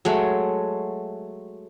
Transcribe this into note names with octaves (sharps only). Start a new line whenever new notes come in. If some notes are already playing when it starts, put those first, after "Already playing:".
F#3 G#3 A3